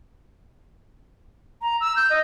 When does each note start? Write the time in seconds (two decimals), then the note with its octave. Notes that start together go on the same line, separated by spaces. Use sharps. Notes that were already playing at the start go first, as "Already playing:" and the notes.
1.62 A#5
1.81 E6
1.96 G6
2.10 D#5